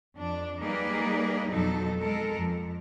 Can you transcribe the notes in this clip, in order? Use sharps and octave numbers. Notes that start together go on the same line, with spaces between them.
F2 D4
G3 A#3 D#4 G#4 B4 D5
F2 B2 F#3 D#4 A4
G#3 A4 A#4
F2